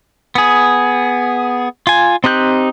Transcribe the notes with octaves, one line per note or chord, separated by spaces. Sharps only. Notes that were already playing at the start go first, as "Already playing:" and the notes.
B3 G#4
F4 G#5
C4 D#4 G4 F#6 G6